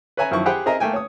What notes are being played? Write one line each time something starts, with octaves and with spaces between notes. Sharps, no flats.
B4 C#5 E5 G#5 A#5
F#2 D#3 F3 E4 C#6
G4 G#4 C5 F#5 G5 B5
C4 G#4 A#4 D#5 E5 A#5
A3 A#3 G5 G#5
C#5 D#6